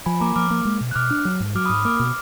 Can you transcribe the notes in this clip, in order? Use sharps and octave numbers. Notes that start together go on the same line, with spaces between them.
F3 G#5 B5
A#3 A#5 D6
F3 D6 F6
A#3
G#3
B2
F#6
B2 D6 F6
D4
F#3
G#2
F#3 D6 F6
B5 D#6
G#2
A#3 D6 F6
B2